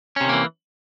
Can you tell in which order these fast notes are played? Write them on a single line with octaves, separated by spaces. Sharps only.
C#4 C3 D#3 A#3 E3